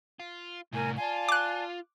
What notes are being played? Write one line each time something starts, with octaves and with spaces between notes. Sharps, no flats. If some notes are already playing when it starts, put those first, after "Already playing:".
F4
C2 A2 A#4 G#5
F4 D5 G#5 A5
D6 F#6